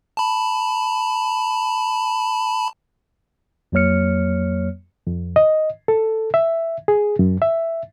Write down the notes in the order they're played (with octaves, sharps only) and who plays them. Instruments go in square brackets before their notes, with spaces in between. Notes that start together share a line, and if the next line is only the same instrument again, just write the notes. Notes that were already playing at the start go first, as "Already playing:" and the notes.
[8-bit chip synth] A5 B5
[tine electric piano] F2 F#3 A#3 C#5 F6 C#7
[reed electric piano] F2
D#5
A4
E5
G#4
F#2
E5